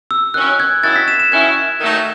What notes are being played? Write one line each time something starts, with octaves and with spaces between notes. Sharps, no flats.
E6
D#3 F#3 C#4 E4 F#6
G#6
D#3 F#3 C#4 E4 A6
B6
E7
E7
D#3 F#3 C#4 E4 G#6
G#6
D#3 F#3 A3 D#4